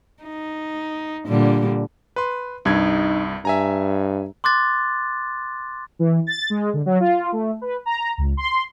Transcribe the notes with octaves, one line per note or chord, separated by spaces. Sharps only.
D#4
A#2 D3 G3
B4 C6
C2 G2 D#4 G#6
G2 E5 G#5 A#5
C6 D6 F#6 A6
E3
A6
G#3
D3
F#3
F4
A3
B4
A#5
C#2
C6